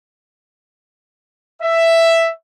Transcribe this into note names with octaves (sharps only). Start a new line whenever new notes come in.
E5